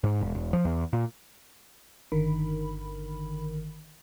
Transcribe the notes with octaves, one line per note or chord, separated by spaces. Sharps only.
G#2
E1
E1
F3
E2
A#2
G1 D3 D#3 A#4 B5